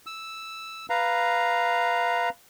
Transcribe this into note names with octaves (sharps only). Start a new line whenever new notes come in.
E6
B4 F5 A#5